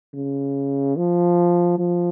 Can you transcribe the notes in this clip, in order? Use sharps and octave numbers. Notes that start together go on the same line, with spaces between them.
C#3
F3
F3